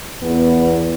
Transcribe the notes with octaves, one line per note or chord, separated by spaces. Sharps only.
E2 B3